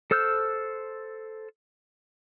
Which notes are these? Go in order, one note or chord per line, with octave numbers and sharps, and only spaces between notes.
A4 C5 E6 F6 G6